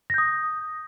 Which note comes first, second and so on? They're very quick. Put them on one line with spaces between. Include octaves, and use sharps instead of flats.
A#6 G6 D#6